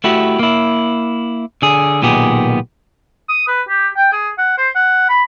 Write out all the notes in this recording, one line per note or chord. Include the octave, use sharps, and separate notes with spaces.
A3 E4 F#4 G4
A#3 E4
D3 G#4
B1 A#2 D#3 B3 G4 G#4
D#6
B4
G4
G5
G#4
F#5
C5
F#5
B5